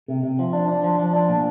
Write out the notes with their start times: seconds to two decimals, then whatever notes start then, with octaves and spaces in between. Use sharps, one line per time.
0.08 C3
0.23 C3
0.39 F3
0.53 D4
0.68 D4
0.84 F3
0.99 F3
1.13 D4
1.29 A#2